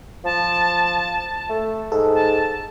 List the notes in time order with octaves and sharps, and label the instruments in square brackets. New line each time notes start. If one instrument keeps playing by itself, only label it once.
[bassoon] F3 [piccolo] A5
[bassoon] A3
[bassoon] G#2 [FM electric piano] A4
[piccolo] A5